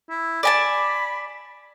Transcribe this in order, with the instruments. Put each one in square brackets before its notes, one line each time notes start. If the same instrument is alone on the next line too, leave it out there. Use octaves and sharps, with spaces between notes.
[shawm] E4
[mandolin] D5 G#5 A5 [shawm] B5